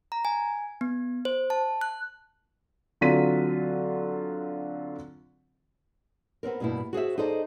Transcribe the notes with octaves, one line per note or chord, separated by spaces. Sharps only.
A#5
G#5
B3
C5
A5
F#6
D3 F#3 C4 F4 B6 D#7
B3 C4 D4 A#4
G2 B2 G3 A#3 E4
F#4 G#4 C5 E5
D#4 G#4 A4 C5 D5 D#5